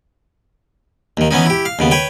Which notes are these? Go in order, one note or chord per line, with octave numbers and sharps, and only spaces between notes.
D#2 D#3
E3 B3 C#4 D#4
E4 G4
F5
D#2 C#3 B3
B4 C#5 G5